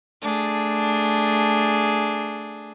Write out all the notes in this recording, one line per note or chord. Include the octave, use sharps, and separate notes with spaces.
A3 D4 G#4